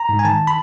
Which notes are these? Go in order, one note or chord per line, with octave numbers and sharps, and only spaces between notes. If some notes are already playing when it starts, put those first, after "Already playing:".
Already playing: A#5
G#2
G#5
D#3 A5
B5